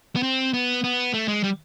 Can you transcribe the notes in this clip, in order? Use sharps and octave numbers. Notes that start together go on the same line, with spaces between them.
B3
C4
B3
B3
A3
G#3
G3